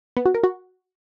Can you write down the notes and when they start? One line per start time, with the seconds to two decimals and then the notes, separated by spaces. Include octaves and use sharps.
0.17 B3
0.26 F#4
0.35 A#4
0.44 F#4